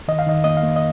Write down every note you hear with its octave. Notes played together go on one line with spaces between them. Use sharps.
D#3 D#5
F5
D#3 D#5
A#3 D#5
F5
A#3
D#5